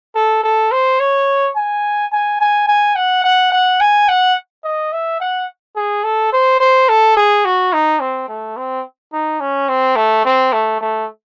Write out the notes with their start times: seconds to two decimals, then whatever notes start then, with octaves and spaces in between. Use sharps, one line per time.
0.15 A4
0.43 A4
0.72 C5
1.00 C#5
1.56 G#5
2.12 G#5
2.40 G#5
2.67 G#5
2.96 F#5
3.24 F#5
3.52 F#5
3.80 G#5
4.09 F#5
4.64 D#5
4.93 E5
5.20 F#5
5.76 G#4
6.04 A4
6.33 C5
6.60 C5
6.89 A4
7.16 G#4
7.45 F#4
7.73 D#4
8.00 C4
8.28 A3
8.57 C4
9.13 D#4
9.40 C#4
9.69 C4
9.96 A3
10.25 C4
10.52 A3
10.81 A3